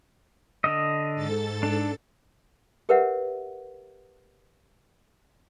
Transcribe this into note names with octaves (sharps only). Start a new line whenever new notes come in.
D3 D#5
G#2 A4 A6
D4
G4 A#4 B4 C#5 E5 F#5